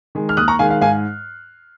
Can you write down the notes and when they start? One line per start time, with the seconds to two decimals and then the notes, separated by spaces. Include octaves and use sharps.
0.15 D#3 G#3
0.29 F6
0.37 D#2 D#6 F#6
0.48 A#5 C#6
0.59 D#3 G#3 F5 G#5
0.70 F5
0.81 G#2 F5 G#5